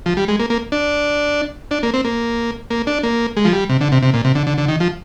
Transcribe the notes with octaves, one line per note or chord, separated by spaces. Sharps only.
F3
G3
G#3
A#3
A#3
D4
D4
A#3
C4
A#3
A#3
D4
A#3
G#3
F3
G3
C3
D3
C3
C3
A#2
C3
D3
D3
D3
D#3
F3